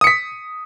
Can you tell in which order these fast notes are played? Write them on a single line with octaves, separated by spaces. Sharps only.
D#6 C#7 B6